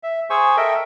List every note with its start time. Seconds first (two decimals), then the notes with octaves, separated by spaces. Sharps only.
0.03 E5
0.30 G#4 C5 G#5 C#6 E6
0.57 A4 A#4 D#5 E5 G5